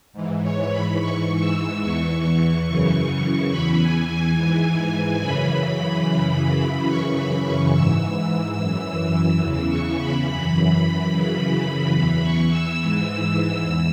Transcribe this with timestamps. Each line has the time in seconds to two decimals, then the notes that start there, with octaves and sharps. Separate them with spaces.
0.13 G#2 E3
0.42 C#5
0.70 B5
0.98 G#2 E3 C#6
1.40 E6
1.83 E2 E3 C#6
2.66 F#2 C#3 E3
3.51 E2 E3 B5
3.78 G#5
4.08 G#5
4.36 G#2 E3
5.19 F#2 C#3 E3 B5
6.04 F#2 C#3 E3
6.88 F#2 C#3 E3 C#6
7.16 B5
7.45 C#6
7.72 G#2 E3 E6
8.57 F#2 E3
9.41 E2 C#3 E3 E6
9.69 C#6
9.98 B5
10.25 F#2 E3 B5
11.10 F#2 C#3 E3
11.94 E2 E3 B5
12.23 C#6
12.50 E6
12.78 G#2 E3
13.62 E2